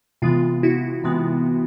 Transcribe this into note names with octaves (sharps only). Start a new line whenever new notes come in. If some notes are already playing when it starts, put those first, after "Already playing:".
C3 E3 G#3 B3 F4
E4 F#4
C3 E3 G#3 B3